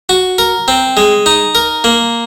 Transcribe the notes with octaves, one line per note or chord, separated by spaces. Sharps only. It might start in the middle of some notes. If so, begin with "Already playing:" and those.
F#4
A#4
C4
G#3
D#4
A#4
A#3